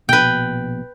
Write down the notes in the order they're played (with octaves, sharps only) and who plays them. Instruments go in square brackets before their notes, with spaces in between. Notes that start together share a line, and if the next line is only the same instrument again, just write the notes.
[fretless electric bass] A#1 B2 [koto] B4 G5